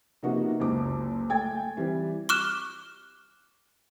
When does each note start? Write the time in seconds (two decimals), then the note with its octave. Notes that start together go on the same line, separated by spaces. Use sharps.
0.23 C3 F3 A#3 B3 D#4 F#4
0.60 F#1 C#2 D6
1.30 A3 G5 G#5 G#6 A6
1.77 E3 G3 C4
2.29 C#6 D6 F6 F#6 E7